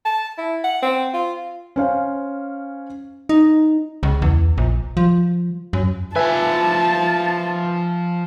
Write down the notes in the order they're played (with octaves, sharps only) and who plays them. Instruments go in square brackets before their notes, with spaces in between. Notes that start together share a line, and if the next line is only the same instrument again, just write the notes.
[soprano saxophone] A5
E4
F#5
C4
F4
[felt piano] C#4 C5 F5
[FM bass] D#4
C#2
E2
A#1
F3
F#2
[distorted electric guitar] F3 G#5 [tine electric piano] B4 E5 [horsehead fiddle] A5